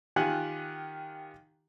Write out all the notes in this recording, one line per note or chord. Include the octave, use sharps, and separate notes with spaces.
D#3 F4 G4 F#5 G#5 F#6